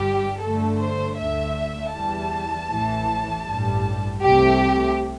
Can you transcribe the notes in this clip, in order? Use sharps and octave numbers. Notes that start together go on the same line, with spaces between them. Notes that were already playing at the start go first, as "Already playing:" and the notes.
Already playing: G1 G2 G3 G4
G2 D3 A3 A4
C5
D2 D3 A3 E5
E2 E3 G3 A5
A1 A2 E3
A1 G2 G3
C2 C3 A3 G4